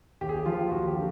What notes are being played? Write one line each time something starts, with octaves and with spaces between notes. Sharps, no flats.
D#2 G4
G#4
G4
F3 F4
D#2 F#4
G4
D3